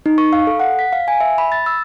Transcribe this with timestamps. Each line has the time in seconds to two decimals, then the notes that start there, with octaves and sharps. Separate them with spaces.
0.06 D#4
0.18 C#6
0.33 F5
0.47 A4
0.60 F#5
0.79 B6
0.93 F5
1.08 G#5
1.20 E5
1.38 B5
1.52 A6
1.66 E6